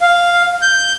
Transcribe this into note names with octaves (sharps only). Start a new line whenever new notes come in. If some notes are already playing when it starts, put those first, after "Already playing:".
F5
G6